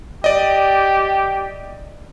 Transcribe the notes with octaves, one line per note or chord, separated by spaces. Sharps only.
G4 D5 D#5